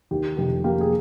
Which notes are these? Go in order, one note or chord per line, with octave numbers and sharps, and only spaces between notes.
D#2 G4
F1 G4
A#3 G4
G#4